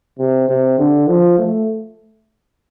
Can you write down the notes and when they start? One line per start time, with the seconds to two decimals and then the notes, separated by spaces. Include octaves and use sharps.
0.19 C3
0.48 C3
0.78 D3
1.07 F3
1.38 A3